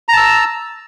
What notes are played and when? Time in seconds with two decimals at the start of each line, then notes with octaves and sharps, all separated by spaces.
0.09 A#5
0.13 A5
0.17 E6